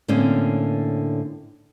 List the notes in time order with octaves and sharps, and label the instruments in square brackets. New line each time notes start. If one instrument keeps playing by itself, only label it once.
[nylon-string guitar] A2 D3 A#3 C4 C#4